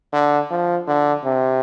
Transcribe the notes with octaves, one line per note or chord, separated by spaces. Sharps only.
D3
F3
D3
C3